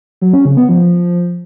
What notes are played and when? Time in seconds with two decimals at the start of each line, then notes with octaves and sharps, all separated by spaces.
0.22 F#3
0.33 C#4
0.45 C#3
0.57 B3
0.69 F3